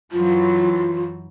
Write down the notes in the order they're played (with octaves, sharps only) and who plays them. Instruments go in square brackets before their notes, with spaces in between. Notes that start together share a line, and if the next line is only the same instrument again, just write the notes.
[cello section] F#2 E3 F#3 [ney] F4